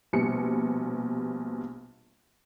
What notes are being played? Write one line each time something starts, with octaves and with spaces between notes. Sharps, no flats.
A#1 B2 G3 C#7